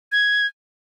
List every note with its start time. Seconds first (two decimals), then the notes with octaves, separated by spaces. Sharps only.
0.12 G#6